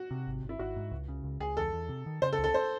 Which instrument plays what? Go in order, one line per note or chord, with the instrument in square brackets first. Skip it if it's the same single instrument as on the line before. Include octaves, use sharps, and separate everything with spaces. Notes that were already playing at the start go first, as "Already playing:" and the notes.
Already playing: [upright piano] F#4
[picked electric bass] C3
G#1
G#1
[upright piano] E4
[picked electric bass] G#1 [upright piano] F#4
[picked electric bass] G#2
C#2
C#3
C#2
[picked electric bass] C#2 [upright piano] G#4
[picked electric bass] E2 [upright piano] A4
[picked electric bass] E2
C3
D#3
[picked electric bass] C#3 [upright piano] C5
[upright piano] A4
[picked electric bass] C#2
[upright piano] A4
C5